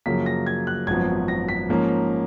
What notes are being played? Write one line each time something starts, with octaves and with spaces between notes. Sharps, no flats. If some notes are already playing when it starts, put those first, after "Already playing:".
F#2 C#3 F3 A#3 B6
A#6
G#6
F#6
G#1 F#2 F3 B3 G#6
A#6
B6
G#2 F3 A#3 C#4